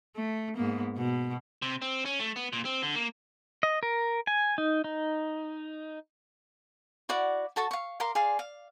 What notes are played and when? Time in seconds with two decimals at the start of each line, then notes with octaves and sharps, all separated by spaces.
0.16 A3
0.55 G#2 A#3 B3
0.97 B2
1.62 C3
1.82 C4
2.05 C#4
2.20 A3
2.36 B3
2.53 A#2
2.65 C4
2.82 D3
2.95 A#3
3.63 D#5
3.83 A#4
4.27 G#5
4.58 D#4
4.84 D#4
7.09 E4 F#4 D5 F#5
7.56 F#4 A4 A5 C#6
7.71 F5 C#6
8.00 A#4 F5 C6 D6
8.15 G#4 D5 F5 C6
8.39 F5